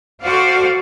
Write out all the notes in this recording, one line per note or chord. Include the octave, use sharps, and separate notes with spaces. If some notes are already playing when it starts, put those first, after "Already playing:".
F#4 A4 C5 D5 F5